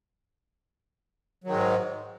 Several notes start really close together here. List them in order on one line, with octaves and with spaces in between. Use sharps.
F#3 D#3 G#3 G#2